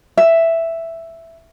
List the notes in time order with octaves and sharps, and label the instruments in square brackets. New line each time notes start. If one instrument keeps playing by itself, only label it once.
[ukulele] E5